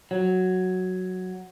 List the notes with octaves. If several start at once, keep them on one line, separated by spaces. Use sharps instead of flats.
F#3